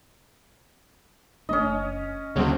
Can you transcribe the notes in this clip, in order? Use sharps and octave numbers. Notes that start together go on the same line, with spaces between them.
F#1 A3 C#4 D4 D#5
D2 C#3 F#3 G#3 A#3 C4 C#4